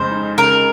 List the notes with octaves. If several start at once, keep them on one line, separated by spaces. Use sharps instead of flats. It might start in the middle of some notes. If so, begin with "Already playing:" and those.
Already playing: F2 C#3 G#3 C5
D#4
C#3 A#4